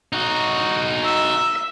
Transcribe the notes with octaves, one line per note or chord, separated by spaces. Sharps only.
D#4 F#4
E5